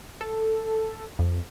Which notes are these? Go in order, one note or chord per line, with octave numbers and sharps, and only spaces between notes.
A4
F2